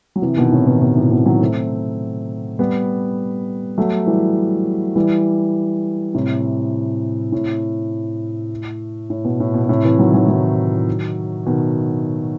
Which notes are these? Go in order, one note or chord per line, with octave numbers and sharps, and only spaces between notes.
F#3
C3 E3
B2 D#3
A2 C3
B2 D#3
B2
A2 C3
B2 D#3
D#3 F#3
A3 C4
G3 B3
F#3 A3
E3 G3
E3 G3
A2 C3
A2
A2
B2
A2
B2
B2
A2 C3
C3 E3
D#3 F#3
D#3 F#3
D#3 F#3
B2 D#3